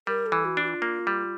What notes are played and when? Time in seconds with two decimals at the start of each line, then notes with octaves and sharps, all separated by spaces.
0.07 G3 A#4
0.26 A4
0.32 E3
0.45 F#4
0.57 D4
0.63 F#4
0.68 F4
0.82 A#3
1.07 G3